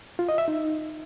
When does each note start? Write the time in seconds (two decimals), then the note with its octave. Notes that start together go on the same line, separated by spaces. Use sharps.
0.19 F4
0.29 D#5
0.38 E5
0.48 D#4